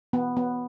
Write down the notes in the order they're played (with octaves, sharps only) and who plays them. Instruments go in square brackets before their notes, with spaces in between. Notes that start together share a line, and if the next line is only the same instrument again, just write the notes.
[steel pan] B3
B3